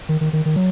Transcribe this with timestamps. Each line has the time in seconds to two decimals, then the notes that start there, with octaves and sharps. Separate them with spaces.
0.09 D#3
0.21 D#3
0.33 D#3
0.46 D#3
0.56 F#3